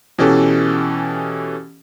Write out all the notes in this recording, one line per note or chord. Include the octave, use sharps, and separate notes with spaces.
B2 E3 C#4 G4 A4